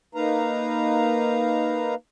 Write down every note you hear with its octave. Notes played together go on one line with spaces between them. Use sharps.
A#3 D#4 B4 F5 A#5